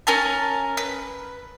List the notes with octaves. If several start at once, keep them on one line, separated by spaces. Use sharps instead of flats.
C#4 A#4 G#5 A5
B4